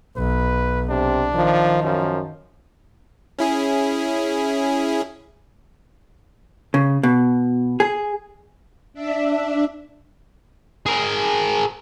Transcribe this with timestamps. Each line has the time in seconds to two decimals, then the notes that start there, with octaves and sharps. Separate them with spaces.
0.17 B1 B4
0.89 C3 D4
1.35 D#3 F3
1.83 F#2 F3
3.39 C#4 E4 G#4
6.74 C#3
7.03 B2
7.80 G#4
8.94 D4 E5
10.86 G#4 A#4